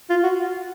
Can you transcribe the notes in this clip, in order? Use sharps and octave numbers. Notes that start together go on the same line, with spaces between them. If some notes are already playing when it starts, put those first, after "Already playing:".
F4
F#4